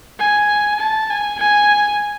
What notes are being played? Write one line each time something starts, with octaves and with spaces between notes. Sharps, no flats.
G#5
A5
G#5
G#5